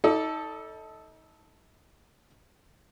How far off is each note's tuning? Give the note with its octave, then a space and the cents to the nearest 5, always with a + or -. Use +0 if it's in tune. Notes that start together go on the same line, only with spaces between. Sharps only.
D#4 +35 A4 +0 D5 +0